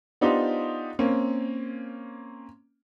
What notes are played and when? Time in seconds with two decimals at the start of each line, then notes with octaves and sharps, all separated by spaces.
0.21 B3 D4 D#4 F4 G4 C5
0.99 A#3 C4 C#4